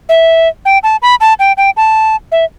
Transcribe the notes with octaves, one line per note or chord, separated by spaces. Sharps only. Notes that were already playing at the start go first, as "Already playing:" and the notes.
E5
G5
A5
B5
A5
G5
G5
A5
E5